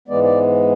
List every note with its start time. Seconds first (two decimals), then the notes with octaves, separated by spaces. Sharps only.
0.08 G#2 E3 G#3 B3 D5
0.23 D5